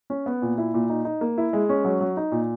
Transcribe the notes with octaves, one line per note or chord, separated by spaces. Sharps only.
C#4
B3
A#2
E4
A#2
D#4
D#4
A#3
E4
G#3
C#4
F#3
F#3
D#4
A#2